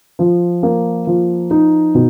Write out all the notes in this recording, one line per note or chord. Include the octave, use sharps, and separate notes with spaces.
F3
A#3
F3
D#4
B2